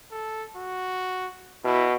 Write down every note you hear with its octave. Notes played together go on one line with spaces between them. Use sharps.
A4
F#4
B2 E4